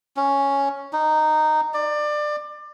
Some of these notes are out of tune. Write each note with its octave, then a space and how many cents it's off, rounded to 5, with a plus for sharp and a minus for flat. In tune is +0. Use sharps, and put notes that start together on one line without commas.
C#4 +0
D#4 -10
D5 +25